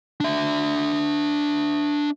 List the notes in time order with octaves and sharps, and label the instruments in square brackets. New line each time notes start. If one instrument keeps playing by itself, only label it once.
[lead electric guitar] D4 E5